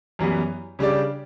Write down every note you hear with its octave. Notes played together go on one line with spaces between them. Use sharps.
F#2 E3 G3 B3
C#3 G3 D4 G4 D5